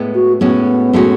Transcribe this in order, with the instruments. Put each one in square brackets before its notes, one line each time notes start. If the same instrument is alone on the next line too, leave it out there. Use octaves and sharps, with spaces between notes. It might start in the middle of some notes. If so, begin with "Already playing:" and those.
Already playing: [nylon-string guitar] A2 G#3 B3
[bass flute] F#4
[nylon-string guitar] A2 G#3 C#4 F#4 [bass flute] B3
[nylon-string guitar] A2 G#3 C#4 F#4